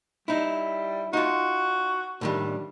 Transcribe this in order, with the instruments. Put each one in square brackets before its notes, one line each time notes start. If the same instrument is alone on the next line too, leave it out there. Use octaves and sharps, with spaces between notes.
[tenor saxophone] G3 [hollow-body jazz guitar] D#4 E4
[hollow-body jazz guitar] D#4 F4 [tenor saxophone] F#4
[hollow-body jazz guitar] A2 D#3 G3 [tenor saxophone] D4